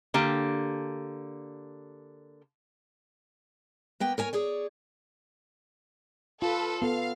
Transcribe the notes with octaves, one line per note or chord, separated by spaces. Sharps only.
D3 A#3 G4
A#3 B3 G5
A#4 C#5 G#5
G#4 C#5 D5
F4 A4 B4
B3 A4 F5